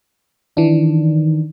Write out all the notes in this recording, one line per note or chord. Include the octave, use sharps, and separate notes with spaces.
D#3 E3 D4